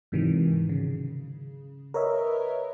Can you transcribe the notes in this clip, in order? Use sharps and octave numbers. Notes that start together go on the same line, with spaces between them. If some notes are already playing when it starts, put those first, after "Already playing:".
G#2 C3 D#3 E3 F#3
C#3
A#4 B4 C#5 D#5 E5